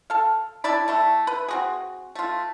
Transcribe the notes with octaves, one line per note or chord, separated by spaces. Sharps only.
A4 F5
D4 E4 D5 B5
A3 E4 A4
B4
C4 F#4 G#4
A3 F4